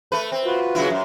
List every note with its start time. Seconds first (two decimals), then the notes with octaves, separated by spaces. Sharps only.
0.12 A3 B4
0.32 C4
0.45 F4 F#4 B4
0.75 C#3 F#3 E4
0.90 F#2